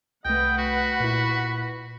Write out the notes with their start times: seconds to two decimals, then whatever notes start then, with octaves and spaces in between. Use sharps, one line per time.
0.25 C2 A3 B4 D#5 F#5 G5
0.58 F#4 B5
1.00 A#2 E4